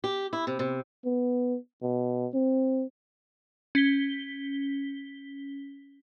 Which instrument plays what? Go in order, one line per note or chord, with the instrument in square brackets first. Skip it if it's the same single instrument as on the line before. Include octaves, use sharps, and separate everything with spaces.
[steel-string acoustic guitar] G4
E4
C3
C3
[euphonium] B3
B2
C4
[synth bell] C#4 B6 G7